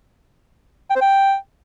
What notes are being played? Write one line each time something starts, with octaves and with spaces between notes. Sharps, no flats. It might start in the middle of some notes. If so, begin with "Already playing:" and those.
G5
C5
G5